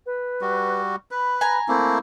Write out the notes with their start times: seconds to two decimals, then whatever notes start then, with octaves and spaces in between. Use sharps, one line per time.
0.06 B4
0.41 G3 F#4
1.11 B4 B5
1.41 G#5 A#5
1.68 A3 A#3 C4 E4